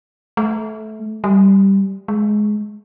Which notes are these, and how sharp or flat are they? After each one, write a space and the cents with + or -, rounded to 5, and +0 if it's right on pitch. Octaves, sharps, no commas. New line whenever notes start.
A3 -20
G3 -5
G#3 +15